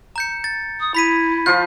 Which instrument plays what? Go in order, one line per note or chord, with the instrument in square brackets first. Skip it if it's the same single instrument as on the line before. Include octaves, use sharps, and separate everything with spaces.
[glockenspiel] A#5 G6 C#7
A6
[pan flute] D#6
[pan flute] E4 [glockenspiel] B5 B6 D#7
[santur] F3 F4 [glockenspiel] G6